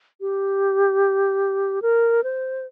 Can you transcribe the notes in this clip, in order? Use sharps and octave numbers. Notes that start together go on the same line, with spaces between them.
G4
A#4
C5